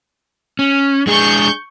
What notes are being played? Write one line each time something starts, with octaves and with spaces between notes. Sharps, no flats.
C#4
G#3 D4 G#4 C#6 G6